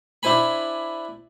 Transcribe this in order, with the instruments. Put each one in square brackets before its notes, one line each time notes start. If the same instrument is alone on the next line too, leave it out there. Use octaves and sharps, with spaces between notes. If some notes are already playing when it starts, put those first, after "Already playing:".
[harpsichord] D4 E4 C5 G#5 B5